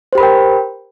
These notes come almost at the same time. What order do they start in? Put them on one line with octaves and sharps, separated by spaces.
C5 G4 B5 A#4 G5